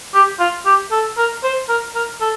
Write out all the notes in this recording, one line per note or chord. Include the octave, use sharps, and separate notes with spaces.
G4
F4
G4
A4
A#4
C5
A#4
A#4
A4